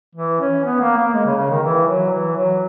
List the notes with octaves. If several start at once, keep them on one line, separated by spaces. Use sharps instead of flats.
E3
C#4
B3
A#3
A#3
G#3
C#3
C#3
D#3
E3
F#3
E3
F#3